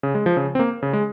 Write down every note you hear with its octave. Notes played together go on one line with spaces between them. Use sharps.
C#3
G#3
F3
C#3
C4
A#3
C#3
G#3